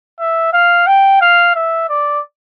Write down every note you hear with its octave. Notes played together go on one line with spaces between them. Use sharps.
E5
F5
G5
F5
E5
D5